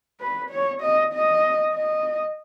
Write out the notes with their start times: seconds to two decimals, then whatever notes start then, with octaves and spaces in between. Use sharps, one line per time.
0.21 B4
0.51 C#5
0.82 D#5
1.13 D#5
1.74 D#5